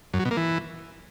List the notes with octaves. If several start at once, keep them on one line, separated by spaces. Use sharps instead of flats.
F#2
F#3
B2
A#3
E3